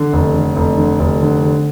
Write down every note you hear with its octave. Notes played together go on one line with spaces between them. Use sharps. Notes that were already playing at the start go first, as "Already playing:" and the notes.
Already playing: D3
F1
D3
F1
D3
F1
D3
D3